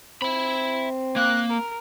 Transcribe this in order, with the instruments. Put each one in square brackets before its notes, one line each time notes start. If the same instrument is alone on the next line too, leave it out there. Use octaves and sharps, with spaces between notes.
[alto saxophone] C4 [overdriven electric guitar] E5 B5
[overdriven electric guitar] A#3 [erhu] F#6
[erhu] A#4